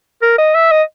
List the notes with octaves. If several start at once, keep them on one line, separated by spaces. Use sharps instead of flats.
A#4
D#5
E5
D#5